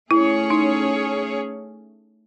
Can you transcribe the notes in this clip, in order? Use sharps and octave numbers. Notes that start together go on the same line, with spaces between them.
A3 C#4 E4 G#4 C#5
D#4